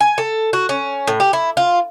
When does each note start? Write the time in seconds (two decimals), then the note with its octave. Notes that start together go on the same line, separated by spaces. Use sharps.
0.01 G#5
0.18 A4
0.53 F#4
0.69 C#4
1.07 A2
1.20 G4
1.33 E4
1.57 F4